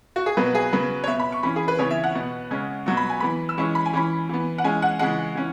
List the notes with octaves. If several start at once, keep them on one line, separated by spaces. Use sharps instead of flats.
F#4
G#4
B2 F#3 B3 B4
G#4
C#3 F#3 B3 B4
C#5
B2 B3 E5
B5
C#6
E3 C#4 B5
G#4
B4
C#3 E3 B3 C#5
E5
F#5
B2 B3
C#3 G#3 C#4
B2 F#3 B3 C#6
B5
G#5
E3 B3 B5
E6
E3 G#3 C#4 C#6
B5
G#5
E3 C#4 B5
E3 B3
F#5
E3 G#3 C#4 G#5
F#5
C#3 E3 G#3 F#5
E3 C#4